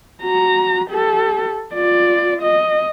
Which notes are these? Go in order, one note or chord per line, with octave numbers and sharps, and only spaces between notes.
F#4 A#5
G4 A4
F4 D5
D#5